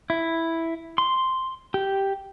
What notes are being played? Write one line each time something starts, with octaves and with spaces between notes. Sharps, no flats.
E4
C6
G4